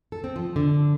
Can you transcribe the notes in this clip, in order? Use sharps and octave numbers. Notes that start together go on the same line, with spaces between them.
A4
C4
F3
D3